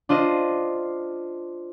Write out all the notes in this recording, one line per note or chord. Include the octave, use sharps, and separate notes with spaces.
D4 F4 C5 D#5